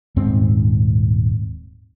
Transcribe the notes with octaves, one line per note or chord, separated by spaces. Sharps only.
D#1 G#2 C4